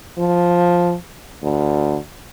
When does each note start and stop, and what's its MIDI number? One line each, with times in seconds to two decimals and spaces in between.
0.18 0.94 53
1.43 1.97 38